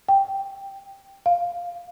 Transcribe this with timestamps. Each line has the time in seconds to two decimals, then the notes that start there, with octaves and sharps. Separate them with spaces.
0.09 G5
1.26 F5